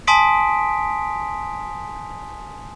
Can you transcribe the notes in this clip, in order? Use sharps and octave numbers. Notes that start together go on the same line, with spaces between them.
G#5 A5 C6 D#6 B6 D7